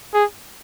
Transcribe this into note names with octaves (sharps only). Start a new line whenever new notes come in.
G#4